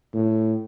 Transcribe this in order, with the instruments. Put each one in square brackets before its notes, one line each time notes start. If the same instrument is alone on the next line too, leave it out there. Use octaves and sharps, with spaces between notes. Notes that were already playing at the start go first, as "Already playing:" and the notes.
[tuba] A2